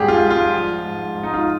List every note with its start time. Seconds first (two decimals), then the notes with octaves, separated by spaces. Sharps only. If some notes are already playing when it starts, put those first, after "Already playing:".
Already playing: F2 G#2 G3 G4 G#4
0.08 F4
0.23 G#2
0.30 F4
0.53 F3
0.84 G#2
1.15 G#2
1.23 D#4
1.34 F4